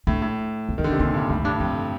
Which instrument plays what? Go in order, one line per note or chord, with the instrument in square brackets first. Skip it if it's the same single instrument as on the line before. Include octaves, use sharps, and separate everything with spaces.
[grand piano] A2 [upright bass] D4
[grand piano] A2
[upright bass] C4
[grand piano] D#3 [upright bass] A#3
[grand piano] D3
[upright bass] C4
[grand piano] C3
[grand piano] A#2 [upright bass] D4
[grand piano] G2
[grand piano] A2 [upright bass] D4
[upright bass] D#4
[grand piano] G2 [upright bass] D4
[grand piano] F2 [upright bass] F3